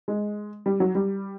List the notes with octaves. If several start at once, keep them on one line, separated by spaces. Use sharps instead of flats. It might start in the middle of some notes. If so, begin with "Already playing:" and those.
G#3
G3
F#3
G3